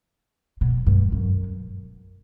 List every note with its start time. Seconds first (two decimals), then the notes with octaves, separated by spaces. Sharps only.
0.61 B2
0.86 G2
1.12 F#2